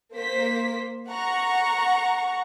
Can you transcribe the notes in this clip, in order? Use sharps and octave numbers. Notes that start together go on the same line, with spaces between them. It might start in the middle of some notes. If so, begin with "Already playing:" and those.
A#3 C5 B6
F#5 A#5 C#6